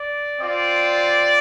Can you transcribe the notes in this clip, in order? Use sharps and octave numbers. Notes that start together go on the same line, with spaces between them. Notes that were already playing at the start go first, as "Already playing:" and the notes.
Already playing: D5
C4 F4 D5